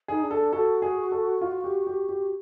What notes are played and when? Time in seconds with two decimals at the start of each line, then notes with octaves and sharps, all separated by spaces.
0.08 D#4 G#4
0.22 D4
0.31 A4
0.53 F#4 A4
0.82 G#4
1.12 A4
1.41 F4
1.64 G4
1.87 G4
2.09 G4